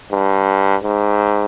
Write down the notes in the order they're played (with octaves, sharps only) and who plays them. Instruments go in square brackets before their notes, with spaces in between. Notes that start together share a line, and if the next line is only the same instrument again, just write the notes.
[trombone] G2
G#2